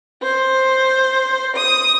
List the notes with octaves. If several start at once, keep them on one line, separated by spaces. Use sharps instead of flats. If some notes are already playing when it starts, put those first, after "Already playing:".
C5
D#6